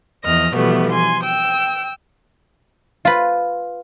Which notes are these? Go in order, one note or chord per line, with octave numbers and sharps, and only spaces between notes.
E2 F3 D#5 F6 A#6
B2 E3 F3 G3 A3 B3
G#5 C6
G5 E6
F4 B4